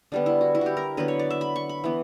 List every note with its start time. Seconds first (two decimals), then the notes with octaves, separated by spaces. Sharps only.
0.12 D3 G3 B3 D4
0.26 E4
0.41 F#4
0.55 E4
0.61 F#4 G4
0.77 A#4
0.97 D3 F#3 B3 B4
1.08 C#5
1.19 D5
1.30 E5
1.41 B5
1.56 C#6
1.69 B5
1.84 E3 B3